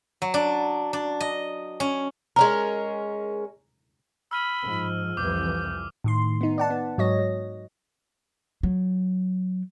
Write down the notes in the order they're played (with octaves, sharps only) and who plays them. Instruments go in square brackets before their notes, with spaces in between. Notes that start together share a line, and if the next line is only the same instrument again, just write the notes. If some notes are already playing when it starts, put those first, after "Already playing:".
[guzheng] F#3
D4
D4
D#5
C#4
[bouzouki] G#3 C#4 A#4 [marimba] A#5
[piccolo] B5 [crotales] E6 F6 D#7
[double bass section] G#2 F3
[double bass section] C2 F2 E3 [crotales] D6 [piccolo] G6
[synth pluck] A2 D#3 C6
B3 D#4
D5 F#5 A5
B3
G#2 F#3 C#5 D#5 A#6
F#3
[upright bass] F#3